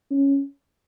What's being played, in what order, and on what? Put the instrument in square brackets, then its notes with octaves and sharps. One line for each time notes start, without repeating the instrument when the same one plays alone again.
[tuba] C#4